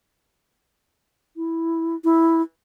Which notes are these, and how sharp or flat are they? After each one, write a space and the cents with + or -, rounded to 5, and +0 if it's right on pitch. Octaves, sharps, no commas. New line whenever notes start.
E4 -5
E4 -5